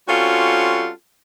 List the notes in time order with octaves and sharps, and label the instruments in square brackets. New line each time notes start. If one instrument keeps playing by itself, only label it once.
[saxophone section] G3 C4 C#4 F4 F#4 A4